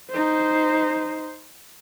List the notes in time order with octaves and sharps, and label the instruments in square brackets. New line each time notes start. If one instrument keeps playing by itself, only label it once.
[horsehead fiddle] D#4 C5